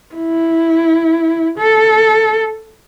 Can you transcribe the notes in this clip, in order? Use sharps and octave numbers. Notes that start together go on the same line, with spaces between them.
E4
A4